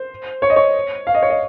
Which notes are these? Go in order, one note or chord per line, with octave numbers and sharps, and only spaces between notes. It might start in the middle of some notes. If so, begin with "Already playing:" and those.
Already playing: C5
C#5
D#5
C#5
F5
D#5
C#5
D#5